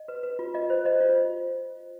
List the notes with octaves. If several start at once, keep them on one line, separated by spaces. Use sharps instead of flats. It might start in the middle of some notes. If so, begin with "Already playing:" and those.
Already playing: D#5
B4
B4
F4
F4 D#5
C5
C5 D#5
F4